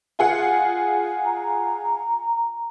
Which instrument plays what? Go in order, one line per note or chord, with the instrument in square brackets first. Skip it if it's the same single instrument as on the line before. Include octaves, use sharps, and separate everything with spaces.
[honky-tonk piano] F4 G#4 F#5
[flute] A#5